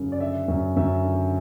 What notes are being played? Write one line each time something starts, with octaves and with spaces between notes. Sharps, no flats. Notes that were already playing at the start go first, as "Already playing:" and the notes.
Already playing: F#2 C#3
D5
D3 E5
F#2
F#2 E5
D3